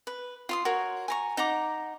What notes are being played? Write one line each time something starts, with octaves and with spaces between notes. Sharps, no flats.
B4
F4 C6 D#6
F#4 A#4 C#5
G#5 A#5 C#6
D#4 F#5 A#5 D6